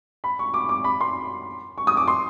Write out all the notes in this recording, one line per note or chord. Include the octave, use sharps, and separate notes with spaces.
B5
C#6
D6
D6
B5
C6
C#6
D#6
D6
C6